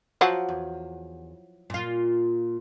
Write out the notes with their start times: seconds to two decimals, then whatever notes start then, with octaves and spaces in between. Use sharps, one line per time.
0.21 F3 F#3 F#5
0.49 E2
1.70 A#2 F4